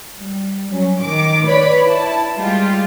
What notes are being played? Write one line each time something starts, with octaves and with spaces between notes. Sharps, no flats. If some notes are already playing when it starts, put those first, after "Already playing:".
G3
F#3 C#4
D#3 D6
B4 C#5 D5 B5
E4 A5
G3 G#3 F4 G4